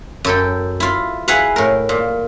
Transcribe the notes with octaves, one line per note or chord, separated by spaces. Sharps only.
F#2 A4 G5
E4 F4
E4 G#4 B4 F5 F#5
A2 A#4
A#2